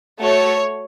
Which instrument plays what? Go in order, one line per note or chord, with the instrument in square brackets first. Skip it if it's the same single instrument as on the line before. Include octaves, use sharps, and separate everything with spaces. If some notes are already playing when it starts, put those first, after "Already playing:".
[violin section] A3 F#4 A4 C#5